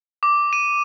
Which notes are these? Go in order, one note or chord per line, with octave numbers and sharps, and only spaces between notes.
D6
D#7